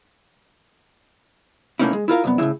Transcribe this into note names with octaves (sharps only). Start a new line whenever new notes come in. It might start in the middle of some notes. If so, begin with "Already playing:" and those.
B2 A3 A#3 C#4 D#4 E4
G#3
E4 F4 A#4 F5
C2 F#2 B3
A2 C#3 E4